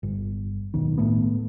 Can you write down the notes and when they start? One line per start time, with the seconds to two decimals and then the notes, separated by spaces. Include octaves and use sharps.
0.03 G1
0.74 D1 B1 D#3
0.98 A2 A3 B3